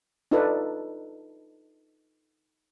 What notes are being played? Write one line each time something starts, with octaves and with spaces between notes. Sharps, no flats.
D4 D#4 F4 A4 B4 D5